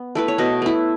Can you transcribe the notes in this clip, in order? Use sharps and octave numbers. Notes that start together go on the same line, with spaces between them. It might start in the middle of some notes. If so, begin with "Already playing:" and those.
Already playing: B3
A3 E4 B4
C#5
B2 B4 D#5
A3 E4